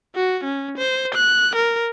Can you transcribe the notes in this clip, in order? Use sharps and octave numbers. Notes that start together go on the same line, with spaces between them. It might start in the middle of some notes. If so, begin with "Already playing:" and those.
F#4
C#4
C5
F#6
A#4